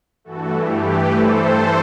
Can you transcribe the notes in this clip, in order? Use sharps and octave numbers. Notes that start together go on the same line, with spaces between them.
G2 E3 A3 F#4 A4
G4
G4 B4
A4 C5